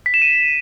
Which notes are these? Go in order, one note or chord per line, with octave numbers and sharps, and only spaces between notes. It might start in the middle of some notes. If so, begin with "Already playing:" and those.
B6
E7
D#7